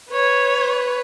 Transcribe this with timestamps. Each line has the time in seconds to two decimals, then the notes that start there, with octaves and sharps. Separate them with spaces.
0.11 B4 C#5